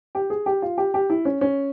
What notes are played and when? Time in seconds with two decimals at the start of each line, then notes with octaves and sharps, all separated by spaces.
0.15 G4
0.30 G#4
0.46 G4
0.62 F4
0.78 G4
0.94 G4
1.10 E4
1.25 C#4
1.41 C#4